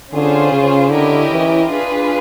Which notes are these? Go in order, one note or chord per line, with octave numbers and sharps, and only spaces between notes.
D3 C#4 F4 G#4 C5
C#3
D3 C#4 E4 G4 A#4 D#5
E3
D4 F4 G#4 B4